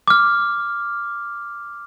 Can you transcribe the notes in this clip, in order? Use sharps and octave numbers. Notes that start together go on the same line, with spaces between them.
D6 F6